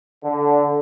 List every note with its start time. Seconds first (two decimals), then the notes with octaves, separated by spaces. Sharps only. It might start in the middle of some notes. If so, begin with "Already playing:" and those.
0.24 D3